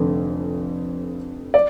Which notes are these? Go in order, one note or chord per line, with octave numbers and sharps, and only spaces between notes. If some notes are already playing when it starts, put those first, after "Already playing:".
Already playing: F1 F2 D3
D5